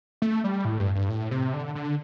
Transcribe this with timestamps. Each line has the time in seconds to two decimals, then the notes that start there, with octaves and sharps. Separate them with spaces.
0.22 A3
0.44 G3
0.65 A2
0.80 G2
0.95 G2
1.09 A2
1.31 C3
1.54 D3
1.75 D3